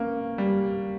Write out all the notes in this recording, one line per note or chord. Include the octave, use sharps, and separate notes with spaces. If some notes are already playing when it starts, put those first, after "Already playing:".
Already playing: A#3 C#4
G3